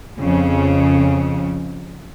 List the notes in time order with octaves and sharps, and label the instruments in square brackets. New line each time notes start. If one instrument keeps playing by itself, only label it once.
[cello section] F2 C#3